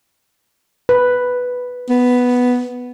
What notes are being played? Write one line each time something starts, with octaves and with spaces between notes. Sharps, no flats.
B4
B3